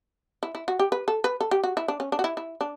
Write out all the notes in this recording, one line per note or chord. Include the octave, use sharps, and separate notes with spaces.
E4
E4
F#4
G4
B4
A4
B4
A4
G4
F#4
E4
D4
C#4
D4
F#4
E4
E4
D4